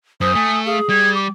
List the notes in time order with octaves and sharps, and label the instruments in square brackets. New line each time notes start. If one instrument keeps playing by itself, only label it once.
[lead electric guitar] F#2 [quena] C5 [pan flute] D#6
[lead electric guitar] A3 [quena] G#5
[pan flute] G#4 [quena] F5
[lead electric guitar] G3 [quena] G#6
[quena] D6